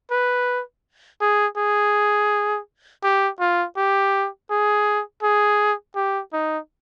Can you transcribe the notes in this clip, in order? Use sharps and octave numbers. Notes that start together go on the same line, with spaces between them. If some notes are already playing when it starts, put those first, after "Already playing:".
B4
G#4
G#4
G4
F4
G4
G#4
G#4
G4
D#4